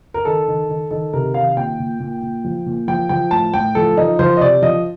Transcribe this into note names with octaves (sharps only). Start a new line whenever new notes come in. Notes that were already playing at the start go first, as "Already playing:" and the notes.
A#4
D#3 A4
D#3
D#3
D#3 A4
C3 A#4
D#3 F5
A#2 G5
A#2
A#2
A#2
F3
A#2
F3 G5
F3 G5
A2 A5
A2 G5
F3 A4
F3 D#4
F3 C5
D#5
C3 D5
F3 D#5